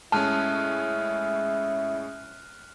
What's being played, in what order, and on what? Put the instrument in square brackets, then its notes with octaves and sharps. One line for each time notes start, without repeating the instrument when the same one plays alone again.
[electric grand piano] A2 G#3 C#4 [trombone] E4 [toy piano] A5 [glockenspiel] F6 F#6 D#7